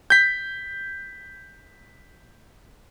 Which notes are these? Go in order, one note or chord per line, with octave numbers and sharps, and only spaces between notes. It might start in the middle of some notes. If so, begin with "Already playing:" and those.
G6 B6